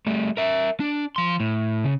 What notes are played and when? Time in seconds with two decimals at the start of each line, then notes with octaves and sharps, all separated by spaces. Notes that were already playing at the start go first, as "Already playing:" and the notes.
0.07 G3 A3
0.37 A#4 E5
0.80 D4
1.16 F3 C6
1.40 A2
1.84 C#3